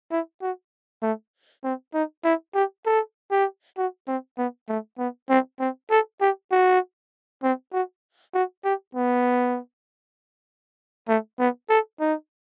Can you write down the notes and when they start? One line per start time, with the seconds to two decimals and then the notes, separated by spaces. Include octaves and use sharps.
0.11 E4
0.42 F#4
1.03 A3
1.64 C4
1.94 D#4
2.25 E4
2.55 G4
2.86 A4
3.31 G4
3.78 F#4
4.08 C4
4.38 B3
4.69 A3
4.99 B3
5.29 C4
5.60 C4
5.90 A4
6.21 G4
6.52 F#4
7.43 C4
7.73 F#4
8.34 F#4
8.65 G4
8.95 B3
11.09 A3
11.39 B3
11.70 A4
12.00 D#4